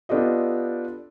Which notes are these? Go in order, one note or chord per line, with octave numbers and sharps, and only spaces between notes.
B3 D4 F4 G4 A4 D#5